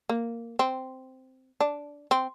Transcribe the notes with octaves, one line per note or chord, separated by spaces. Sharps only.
A#3
C4
D4
C4